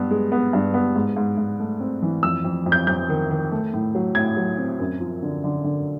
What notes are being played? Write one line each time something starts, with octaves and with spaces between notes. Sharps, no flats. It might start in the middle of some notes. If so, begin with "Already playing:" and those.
Already playing: G2 B3
G#3
B3
G2
B3
G#2
G#2
G#2
A3
C4
E3
F2 E6
F2
F2
G6
F2 G6
D#3
D#3
A3
A2
F#3
A2 G#6
F#3
C4
F#2
F3
D3
D3
D3